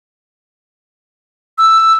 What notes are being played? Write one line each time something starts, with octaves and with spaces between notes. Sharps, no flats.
E6